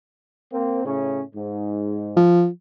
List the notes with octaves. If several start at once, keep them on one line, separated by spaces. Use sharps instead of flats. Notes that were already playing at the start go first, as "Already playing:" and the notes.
A#3 C4
A2 C#3 C#4
G#2
F3